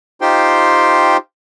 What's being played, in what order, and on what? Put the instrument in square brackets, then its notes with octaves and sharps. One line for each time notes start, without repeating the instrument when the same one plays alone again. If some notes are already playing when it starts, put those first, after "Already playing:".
[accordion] D#4 F4 G4 C5 G5 C6